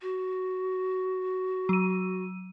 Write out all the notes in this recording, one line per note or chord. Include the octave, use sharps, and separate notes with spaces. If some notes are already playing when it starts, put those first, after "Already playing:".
F#4
F#3 D#7